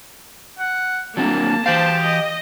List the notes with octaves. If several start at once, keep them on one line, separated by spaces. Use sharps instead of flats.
F#5
F#3 A#3 C4 D4 A5
E3 G4 C5 F5 A5
D#5